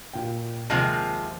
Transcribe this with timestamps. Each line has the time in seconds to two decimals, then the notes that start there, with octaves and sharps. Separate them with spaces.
0.13 A#2 G5
0.70 D#2 C3 F3 G#3 A5 A#6